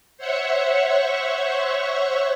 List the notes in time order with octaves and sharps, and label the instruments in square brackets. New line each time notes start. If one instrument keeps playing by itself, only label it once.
[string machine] C5 C#5 E5 F#5 C#6